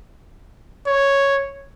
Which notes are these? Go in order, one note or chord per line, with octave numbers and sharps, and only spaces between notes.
C#5